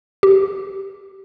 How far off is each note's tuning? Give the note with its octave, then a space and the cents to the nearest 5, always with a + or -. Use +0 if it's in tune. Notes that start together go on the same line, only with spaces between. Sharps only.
G4 -15